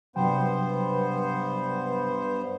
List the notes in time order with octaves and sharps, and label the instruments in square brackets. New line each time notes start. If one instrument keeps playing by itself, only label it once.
[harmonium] G2 B3 C5 [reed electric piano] C3 F#3 G5